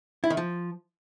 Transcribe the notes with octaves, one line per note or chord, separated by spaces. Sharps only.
E4
D#3
F3